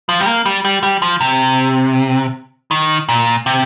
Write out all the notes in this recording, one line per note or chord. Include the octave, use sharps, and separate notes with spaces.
F3
G3
A#3
G3
G3
G3
F3
C3
D#3
A#2
C3